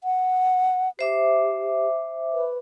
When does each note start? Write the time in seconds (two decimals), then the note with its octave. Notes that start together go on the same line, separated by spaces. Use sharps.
0.04 F#5
0.99 G4 C5 E5 D6
2.33 B4